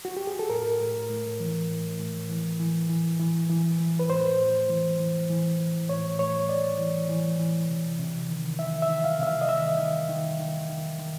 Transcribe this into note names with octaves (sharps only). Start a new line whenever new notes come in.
F#4
G4
G#4
A4
A2 A#4
A2
A2
E3
A2
A2
E3
E3
E3
E3
E3
E3
B4
A2 C5
A2
E3
E3
E3
E3
A2 C#5
A2 C#5
A2 D5
E3
E3
E3
C3
C3
D#3
D#3 E5
E5
D#3
F5
C3 E5
F5
D#5
D#3 E5
D#3
D#3
D#3
D#3
D#3